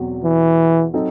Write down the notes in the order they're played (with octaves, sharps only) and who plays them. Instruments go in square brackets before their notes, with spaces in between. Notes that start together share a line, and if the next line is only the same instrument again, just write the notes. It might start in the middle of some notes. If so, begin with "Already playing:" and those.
Already playing: [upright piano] E2 B2 F#3 C4 F#4
[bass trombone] E3
[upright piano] F#3 C4 D#4 A4